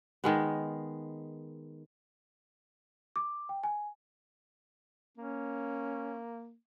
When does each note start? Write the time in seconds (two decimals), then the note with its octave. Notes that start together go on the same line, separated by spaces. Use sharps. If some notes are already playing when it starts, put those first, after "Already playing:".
0.24 D#3 G#3 B3
3.16 D6
3.49 G5
3.63 G#5
5.17 A#3 C#4